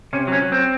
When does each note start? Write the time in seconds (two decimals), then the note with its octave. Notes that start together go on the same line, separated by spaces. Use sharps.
0.13 C3 C#4
0.28 F#3 C#4
0.42 F#3
0.52 C4